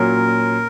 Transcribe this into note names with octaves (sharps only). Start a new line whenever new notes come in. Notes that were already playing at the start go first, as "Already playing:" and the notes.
Already playing: A#2 F#3 C#4 A#4